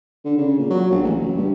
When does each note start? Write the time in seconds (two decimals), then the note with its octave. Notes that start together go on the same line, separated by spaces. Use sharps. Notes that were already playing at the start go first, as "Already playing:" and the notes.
0.25 D3
0.38 C#3
0.58 A#2
0.70 F#3
0.91 A#1
1.03 A1
1.19 F#1
1.37 G2